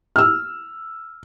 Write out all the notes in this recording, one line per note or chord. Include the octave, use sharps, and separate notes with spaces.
E6 F6